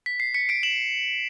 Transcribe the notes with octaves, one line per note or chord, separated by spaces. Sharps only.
B6
C7
B6 C#7
C7 D7
E7 F#7